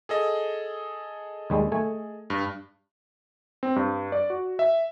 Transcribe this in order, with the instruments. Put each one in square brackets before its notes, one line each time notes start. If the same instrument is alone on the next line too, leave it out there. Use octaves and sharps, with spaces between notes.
[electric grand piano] G#4 A4 D#5
[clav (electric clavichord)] D#2 G3 G#3
A3 G#5
[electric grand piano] G2
C4
G2
D5
F#4
E5